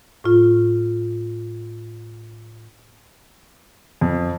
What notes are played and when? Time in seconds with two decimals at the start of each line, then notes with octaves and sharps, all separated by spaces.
0.24 A2 F4
4.01 F2